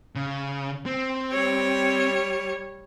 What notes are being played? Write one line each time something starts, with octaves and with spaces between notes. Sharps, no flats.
C#3
C4
G3 C#5